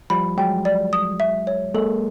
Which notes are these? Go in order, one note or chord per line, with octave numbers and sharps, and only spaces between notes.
F3 G3 B5
F#3 G#3 G5
D5
D#6
E5
C#5
G#3 A#3 A4